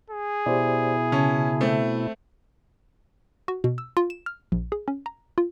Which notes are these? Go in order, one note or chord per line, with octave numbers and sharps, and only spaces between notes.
G#4
B2 E4 G4 C5 D5
C#3 C#4 A5
A3 C4
F#4
B2
E6
F4
E7
F6
A#1
G#4
C#4
A#5
F4